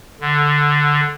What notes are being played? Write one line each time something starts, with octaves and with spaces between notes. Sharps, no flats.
D3